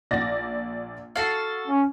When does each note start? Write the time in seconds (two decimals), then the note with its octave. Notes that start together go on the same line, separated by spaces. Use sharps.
0.11 A#1 D5 A#6
1.16 F#4 A4 F5 G#6
1.67 C#4